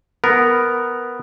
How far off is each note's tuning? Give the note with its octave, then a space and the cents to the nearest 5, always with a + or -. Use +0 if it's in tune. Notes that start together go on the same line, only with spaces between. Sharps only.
B3 +0 A#4 +0